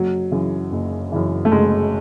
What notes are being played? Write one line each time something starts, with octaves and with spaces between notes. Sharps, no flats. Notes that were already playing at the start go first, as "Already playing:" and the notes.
Already playing: F#1 F#3
F#2 C#3 E3
F#1
F#2 C#3 E3
A3
F#1 G#3